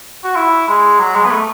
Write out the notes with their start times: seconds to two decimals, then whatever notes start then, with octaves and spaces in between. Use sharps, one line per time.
0.24 F#4
0.36 E4
0.68 G#3
1.00 F#3
1.15 G#3
1.24 B3
1.31 A3